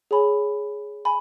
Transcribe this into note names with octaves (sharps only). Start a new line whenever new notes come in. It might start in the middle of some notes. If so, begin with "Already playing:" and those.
G#4 C#5 G#5 B5
G#5 B5